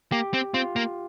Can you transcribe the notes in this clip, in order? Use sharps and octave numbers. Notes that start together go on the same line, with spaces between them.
A#3 G4
C4
C4 F4
A#3